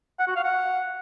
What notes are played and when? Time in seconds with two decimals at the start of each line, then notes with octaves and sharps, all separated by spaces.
0.19 F#5
0.27 F#4
0.36 F5
0.44 F#5